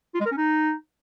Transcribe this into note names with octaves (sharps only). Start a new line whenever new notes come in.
F4
G#3
A#4
C#4
D#4